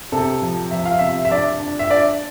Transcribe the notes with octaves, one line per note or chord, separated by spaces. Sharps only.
C3 A4
F3
F3 E5
F5
C3 E5
E5
D4 D5
D4
E5
D4 D5